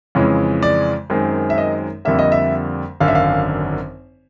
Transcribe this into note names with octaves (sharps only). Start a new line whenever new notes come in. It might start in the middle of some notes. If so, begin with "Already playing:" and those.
F2 C#3 E3 G#3
D5
F#2 D#3 G#3 C4
E5
D#5
F2 D3 G3 A#3 E5
D#5
E5
G#1 F#2 D3 F5
E5
F5